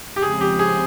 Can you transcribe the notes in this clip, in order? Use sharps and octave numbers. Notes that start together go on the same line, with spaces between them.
G4
C#3 F3 G#3 C4 G#4
G4
G#4